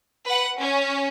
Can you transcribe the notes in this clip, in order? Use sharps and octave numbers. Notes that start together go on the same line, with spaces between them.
B4 F#5
C#4